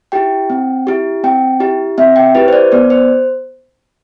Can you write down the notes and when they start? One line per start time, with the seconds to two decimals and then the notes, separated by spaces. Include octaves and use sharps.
0.12 E4 G4 G5
0.50 C4
0.87 E4 G4
1.24 C4 G5
1.60 E4 G4
1.98 C4 E5
2.16 G5
2.35 E4 G4 B4
2.48 C5
2.53 D5
2.72 B3 D5
2.90 C5